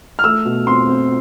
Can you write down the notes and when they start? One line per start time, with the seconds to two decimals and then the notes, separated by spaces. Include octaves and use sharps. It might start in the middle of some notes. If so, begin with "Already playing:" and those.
0.19 F6
0.24 A3 E6
0.45 B2
0.67 C4 C6
0.88 C4